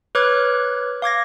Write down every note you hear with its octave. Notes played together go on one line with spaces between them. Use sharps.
B4 C#5 D6 F6 F#6 G#6
F5 D6 G#6 A#6